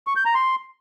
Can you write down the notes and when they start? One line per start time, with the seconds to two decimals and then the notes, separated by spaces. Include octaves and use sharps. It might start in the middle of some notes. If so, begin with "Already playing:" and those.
0.07 C#6
0.16 G6
0.26 A#5
0.35 C6